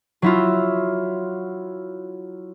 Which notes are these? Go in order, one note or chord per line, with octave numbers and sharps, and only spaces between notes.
F#3 E4 F4